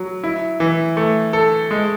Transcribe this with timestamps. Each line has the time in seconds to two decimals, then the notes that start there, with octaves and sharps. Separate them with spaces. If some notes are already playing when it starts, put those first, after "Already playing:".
Already playing: F#3
0.23 E4
0.60 E3
0.97 A3
1.33 A4
1.71 G#3